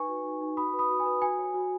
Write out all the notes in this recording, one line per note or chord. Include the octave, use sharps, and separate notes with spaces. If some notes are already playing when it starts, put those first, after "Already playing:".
Already playing: D#4 B4 G#5 C#6
F#4
D#4
D#4
F#4 B5 D#6
B4
B5 D#6
F#4
G#5
B4
F#4 G#5
C#5
F#4